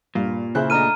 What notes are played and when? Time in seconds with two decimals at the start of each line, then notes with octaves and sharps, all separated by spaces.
0.15 G2 A#2 F5
0.55 C#3 E4 G#4 C5 F#6
0.70 A3 D4 D#5 A#5 F6 D#7